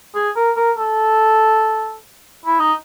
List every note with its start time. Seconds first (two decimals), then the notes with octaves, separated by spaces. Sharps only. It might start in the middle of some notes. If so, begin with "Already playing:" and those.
0.15 G#4
0.36 A#4
0.57 A#4
0.78 A4
2.46 E4
2.60 D#4